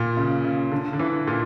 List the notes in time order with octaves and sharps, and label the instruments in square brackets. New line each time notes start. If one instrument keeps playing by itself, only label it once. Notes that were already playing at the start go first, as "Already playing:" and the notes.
Already playing: [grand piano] A#2
C#3
C#3
D3
D3
E3
A#2